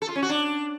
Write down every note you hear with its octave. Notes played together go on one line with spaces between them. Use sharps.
A4
F4
C#4
F#4
D4